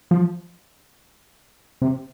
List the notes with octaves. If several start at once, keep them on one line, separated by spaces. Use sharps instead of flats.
F3
C3